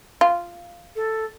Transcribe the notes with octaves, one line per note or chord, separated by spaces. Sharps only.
F4
A4